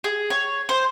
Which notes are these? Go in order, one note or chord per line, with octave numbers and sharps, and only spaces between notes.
G#4
C#5
C5